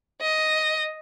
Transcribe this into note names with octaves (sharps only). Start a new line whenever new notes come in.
D#5